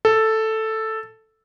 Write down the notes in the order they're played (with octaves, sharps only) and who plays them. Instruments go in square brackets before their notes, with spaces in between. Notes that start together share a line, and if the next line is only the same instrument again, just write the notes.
[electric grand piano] A4